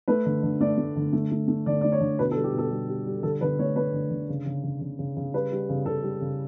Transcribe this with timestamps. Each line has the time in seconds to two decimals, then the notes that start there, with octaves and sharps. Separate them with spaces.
0.08 A3 B4
0.26 D3
0.43 D3
0.61 A3 D5
0.78 A3
0.96 D3
1.13 A3
1.31 A3
1.48 A3
1.66 D3 D5
1.81 A3 D5
1.92 C#5
2.00 D3
2.19 B2 B4
2.31 A4
2.36 G3
2.44 G4
2.53 B2
2.58 A4
2.70 G3
2.89 G3
3.06 G3
3.23 D3 A4
3.41 D3 B4
3.59 A3 C#5
3.76 A3 B4
3.93 D3
4.10 D3
4.29 C#3
4.46 C#3
4.63 C#3
4.81 C#3
4.99 C#3
5.17 C#3
5.33 G3 B4
5.52 G3
5.69 C#3
5.86 C#3 A4
6.03 G3
6.21 C#3